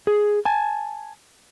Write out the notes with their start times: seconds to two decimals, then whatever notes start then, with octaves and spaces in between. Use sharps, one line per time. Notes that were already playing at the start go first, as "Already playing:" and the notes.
0.07 G#4
0.45 G#5 A5